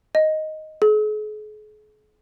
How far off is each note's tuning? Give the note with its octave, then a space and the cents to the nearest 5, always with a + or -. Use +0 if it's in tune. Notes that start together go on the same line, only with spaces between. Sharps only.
D#5 +5
G#4 +45